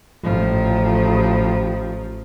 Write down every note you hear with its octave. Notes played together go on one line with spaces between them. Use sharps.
A1 F3